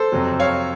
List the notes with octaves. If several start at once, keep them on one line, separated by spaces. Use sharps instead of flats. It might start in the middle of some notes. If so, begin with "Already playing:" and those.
Already playing: A4 C5
F2 C3 F#3
C#5 F5